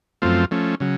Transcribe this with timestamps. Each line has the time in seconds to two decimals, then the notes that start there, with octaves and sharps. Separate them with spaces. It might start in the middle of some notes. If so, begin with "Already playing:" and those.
0.22 F#2 F3 A3 C4 F4
0.51 F3 A3 C#4
0.80 C#3 F#3